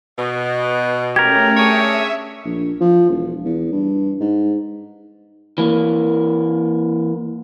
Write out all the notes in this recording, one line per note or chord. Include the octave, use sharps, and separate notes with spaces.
B2
A3 C#4 G4 A#4 G#6
D4 G#4 C#5 E5
A#1
F3
E1
E2
G2
G#2
E3 A#3